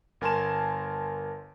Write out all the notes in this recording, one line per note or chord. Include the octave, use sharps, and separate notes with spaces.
G1 A#4 G#5 A5 C6 E7